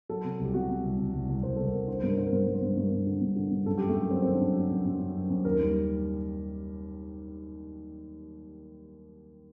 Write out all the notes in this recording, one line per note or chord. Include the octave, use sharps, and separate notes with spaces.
F#3 A4
C3
C2 G4
C3 F#4
C3
C2
C2
C2
C2
C2 C5
C2 A4
A#4
C2
D3 C5
G2 A#4
D3 C5
A#4
G2 C5
G2
C5
G2
G2 A#4
G2
D3
G2
D3
G2
F#2 A4
F#3 G4
A3
F#2 A#3
F#3 C4
D#3 C4
D4
F#2
F#3
F#2
F#2
F#2
F#3
F#2
D#2 A#4
G3